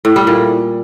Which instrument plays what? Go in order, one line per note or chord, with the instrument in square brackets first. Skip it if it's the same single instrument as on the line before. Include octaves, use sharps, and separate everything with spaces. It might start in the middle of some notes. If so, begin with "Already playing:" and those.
[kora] A2
G3
A#2